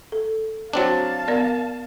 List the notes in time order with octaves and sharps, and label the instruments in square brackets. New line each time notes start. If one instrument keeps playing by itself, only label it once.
[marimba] A4
[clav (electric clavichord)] F#3 C4 D4 [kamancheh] F5 A5
[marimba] B3 A#4 D5